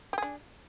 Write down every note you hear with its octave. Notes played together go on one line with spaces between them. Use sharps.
D4 G4 G#4